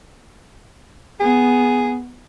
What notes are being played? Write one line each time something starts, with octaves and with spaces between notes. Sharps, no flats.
B3 G#4